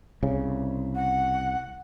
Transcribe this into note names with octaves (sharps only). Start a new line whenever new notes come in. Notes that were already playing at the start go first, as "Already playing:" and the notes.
C2 C#3
F#5